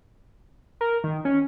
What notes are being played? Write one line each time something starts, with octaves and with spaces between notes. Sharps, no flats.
A#4
D#3
C#4